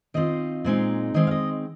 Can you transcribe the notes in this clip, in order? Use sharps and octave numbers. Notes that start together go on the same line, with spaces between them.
D#3 C4 F4 D#5
A#2 G#3 C4 D#4
D#3 G#3 C4 D#5
F5
D#5